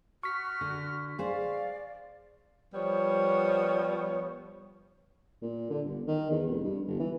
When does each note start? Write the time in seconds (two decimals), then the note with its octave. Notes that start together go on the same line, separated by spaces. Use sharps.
0.23 F#4 C#6 F6 B6
0.61 D3
1.19 G#4 C5 D5 F5
2.74 F3 G3 B3 C#5
5.42 A#2
5.70 D3
5.85 G1
6.07 D#3
6.31 E2
6.47 F1
6.64 G2
6.88 G1
7.00 E3